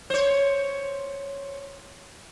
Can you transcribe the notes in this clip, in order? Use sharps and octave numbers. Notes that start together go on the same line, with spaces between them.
C5 C#5